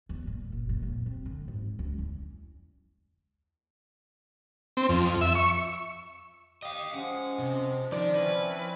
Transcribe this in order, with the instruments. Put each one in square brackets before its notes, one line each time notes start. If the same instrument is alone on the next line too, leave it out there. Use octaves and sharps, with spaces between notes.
[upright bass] E2
A#2
F#1
A#2
F2
C4
D3
G#2
C#2
E2
[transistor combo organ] C4
F2
E5
C#6
[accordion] G4 D#6 [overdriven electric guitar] D#5 F5
[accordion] F3 G#3 [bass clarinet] C#4 [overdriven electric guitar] F#5
[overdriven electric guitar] C3
[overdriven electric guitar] D#3 [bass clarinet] F3 [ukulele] D5
[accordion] C4 C#4 E4 [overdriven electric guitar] B4